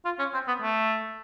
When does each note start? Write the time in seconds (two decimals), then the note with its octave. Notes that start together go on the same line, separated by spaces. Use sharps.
0.05 F4
0.19 C#4
0.33 C4
0.48 B3
0.62 A3